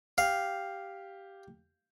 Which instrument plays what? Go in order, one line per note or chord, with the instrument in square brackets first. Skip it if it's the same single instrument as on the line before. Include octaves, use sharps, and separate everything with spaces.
[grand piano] G4 [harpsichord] F5